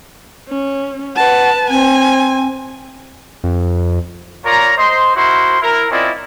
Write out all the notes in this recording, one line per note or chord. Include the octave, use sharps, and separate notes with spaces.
C#4
B4 F#5 A5
C4 G#5
F2
F4 A#4 C#5 D5 A#5
C5 D#5 C6
E4 F#4 A#4 C5 C6
E4 A#4
C4 C#4 E4 F4 D5 D#5